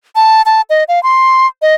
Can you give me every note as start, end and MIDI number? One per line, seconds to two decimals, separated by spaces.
0.16 0.42 81
0.46 0.61 81
0.70 0.84 75
0.88 1.02 77
1.03 1.46 84
1.62 1.75 75